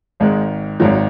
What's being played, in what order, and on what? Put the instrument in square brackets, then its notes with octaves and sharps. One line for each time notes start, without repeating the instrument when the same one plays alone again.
[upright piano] G#1 G#2 D#3 G#3
G#1 G#2 D#3 F#3